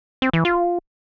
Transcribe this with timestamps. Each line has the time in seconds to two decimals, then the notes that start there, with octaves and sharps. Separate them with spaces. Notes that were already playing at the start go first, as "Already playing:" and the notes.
0.22 C4
0.33 E3
0.45 F4